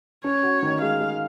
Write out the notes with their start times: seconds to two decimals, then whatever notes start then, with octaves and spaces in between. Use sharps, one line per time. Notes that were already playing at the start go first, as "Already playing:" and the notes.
0.24 C#4 C#5
0.43 F#4
0.63 D#3
0.82 G#3 F5
1.01 G#3